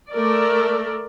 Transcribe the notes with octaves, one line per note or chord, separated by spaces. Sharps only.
A3 A4 A#4 D5